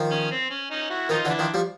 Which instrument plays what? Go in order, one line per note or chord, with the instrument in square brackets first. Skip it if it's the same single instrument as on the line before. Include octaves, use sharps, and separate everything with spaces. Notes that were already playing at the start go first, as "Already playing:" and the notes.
Already playing: [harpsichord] D#3 F3
[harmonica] C#4
C4
C#4
C#4 D#4
E4 F#4
[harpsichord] D#3 F3 [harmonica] D#4 F4
[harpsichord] D3 E3
[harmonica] D4 E4
[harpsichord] D#3 F3
F3 G3